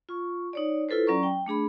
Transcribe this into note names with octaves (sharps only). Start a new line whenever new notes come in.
F4 C#6
D#4 C#5 D5
E4 F4 A4 B4 C5
F#3 C#4 D5 A#5 C#6
G5
A3 D4 G#4 B5